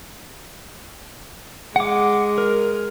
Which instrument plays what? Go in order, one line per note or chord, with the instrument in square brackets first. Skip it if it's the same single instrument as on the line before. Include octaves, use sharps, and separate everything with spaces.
[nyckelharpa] G#3 [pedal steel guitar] F#5 D6
[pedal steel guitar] A#4